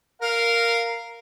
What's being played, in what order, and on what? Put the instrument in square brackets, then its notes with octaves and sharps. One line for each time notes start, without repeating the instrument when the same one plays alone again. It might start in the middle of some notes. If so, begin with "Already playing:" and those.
[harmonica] A#4 F5